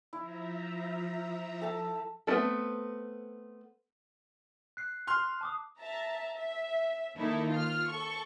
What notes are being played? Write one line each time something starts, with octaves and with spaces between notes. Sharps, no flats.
F3 E4 E5 A#5
A4 A5
A3 B3 C4 E4 A4
F#6 C7
C6 F6
A5 D6 D#6
E5 A5 A#5
E5
D#3 A#3 D#4 E4 A4
F4 F6
A4 C#6